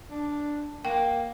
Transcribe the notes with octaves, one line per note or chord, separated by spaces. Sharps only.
D4
A#3 G5